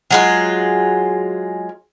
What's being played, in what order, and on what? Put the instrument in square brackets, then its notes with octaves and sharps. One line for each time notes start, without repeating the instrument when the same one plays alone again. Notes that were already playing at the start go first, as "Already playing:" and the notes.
[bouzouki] F#3 G#3 F4